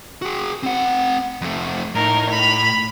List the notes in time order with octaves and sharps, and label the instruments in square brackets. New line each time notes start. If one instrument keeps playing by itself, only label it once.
[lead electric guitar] F#4 G#4
C4 F#5
F2 A3
[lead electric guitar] A2 [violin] D#4 A#4
[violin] B5 F7